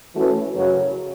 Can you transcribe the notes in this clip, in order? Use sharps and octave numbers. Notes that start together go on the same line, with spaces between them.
E3 A3 C#4 F#4 B4
F#2 C#3 F#3